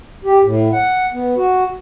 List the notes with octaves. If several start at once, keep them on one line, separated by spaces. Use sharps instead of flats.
G4
A2
F#5
B3
F#4